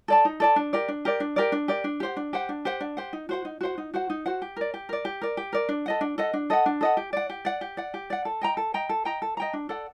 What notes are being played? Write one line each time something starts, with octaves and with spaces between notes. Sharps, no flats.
A4 D5 A5
D#4
A4 D5 A5
D4
G4 A#4 D5
D4
G4 A#4 D5
D4
G4 A#4 D5
D4
G4 A#4 D5
D4
G4 C5 F#5
D4
G4 C5 F#5
D4
G4 C5 F#5
D4
G4 C5 F#5
D#4
F#4 C5 F#5
D#4
F#4 C5 F#5
D#4
F#4 C5 F#5
D#4
F#4 C5 F#5
G4
A#4 D5
G4
A#4 D5
G4
A#4 D5
G4
A#4 D5
D4
A4 D#5 F#5
D4
A4 D#5 F#5
D4
A4 D#5 F#5
D4
A4 D#5 F#5
G4
D5 F#5
G4
D5 F#5
G4
D5 F#5
G4
D5 F#5
A4
D#5 G5 A#5
A4
D#5 G5 A#5
A4
D#5 G5 A#5
A4
D#5 G5 A#5
D4
A4 D5 F#5